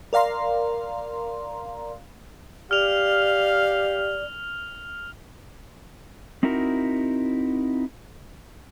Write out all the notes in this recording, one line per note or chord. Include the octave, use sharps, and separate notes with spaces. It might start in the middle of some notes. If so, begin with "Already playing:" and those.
A#4 D5 F5 A#5 C6
G4 D5 F5 F6 F7
C4 D#4 E4 F#4 A#4